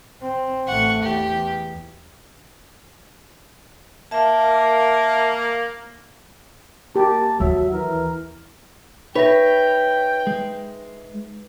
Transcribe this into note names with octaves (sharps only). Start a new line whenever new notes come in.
C4
A1 A3 F#5 C#6
E2 G4
A#3 E5 A5
A#3 G4 A5
D#2 F#3 E5
E3 A#4
D#4 B4 C#5 E5 G5 A#6
G#3